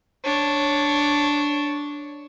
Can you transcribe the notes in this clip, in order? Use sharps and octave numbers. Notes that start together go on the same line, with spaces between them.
D4 C#5